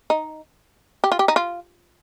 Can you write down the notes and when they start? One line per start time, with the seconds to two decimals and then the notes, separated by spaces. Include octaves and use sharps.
0.10 D#4
1.04 G4
1.12 F4
1.19 G4
1.28 D#4
1.36 F4